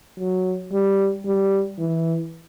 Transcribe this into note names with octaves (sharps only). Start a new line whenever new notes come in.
F#3
G3
G3
E3